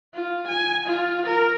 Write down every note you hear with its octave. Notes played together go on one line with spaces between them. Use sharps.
F4
G#5
F4
A#4